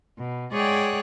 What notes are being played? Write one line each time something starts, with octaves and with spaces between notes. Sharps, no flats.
B2
G#3 G#4 C#5 D5 F#5 G5